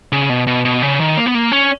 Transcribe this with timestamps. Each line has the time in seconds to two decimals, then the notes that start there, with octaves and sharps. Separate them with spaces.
0.12 C#3
0.29 B2
0.47 B2
0.65 B2
0.82 C#3
1.00 D#3
1.17 A#3
1.26 B3
1.35 A#3
1.52 C#4